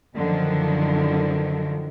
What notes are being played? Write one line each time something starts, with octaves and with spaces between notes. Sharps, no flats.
F#2 D3 D#3 F3